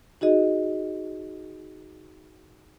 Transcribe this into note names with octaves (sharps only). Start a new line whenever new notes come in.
D#4 F#4 G#4 D#5